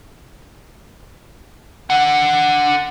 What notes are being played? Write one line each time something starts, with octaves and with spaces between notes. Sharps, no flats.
D4 F#5